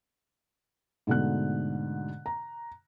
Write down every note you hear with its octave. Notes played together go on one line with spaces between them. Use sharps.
G#2 B2 D3 A3 F#6
A#5